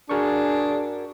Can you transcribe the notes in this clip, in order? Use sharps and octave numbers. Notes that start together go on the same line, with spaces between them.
D4 F#4 G#4 A#4 C#6